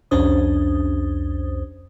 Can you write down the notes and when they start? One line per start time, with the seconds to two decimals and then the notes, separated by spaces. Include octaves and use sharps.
0.11 C2 F2 C#4 D4 C5 D#6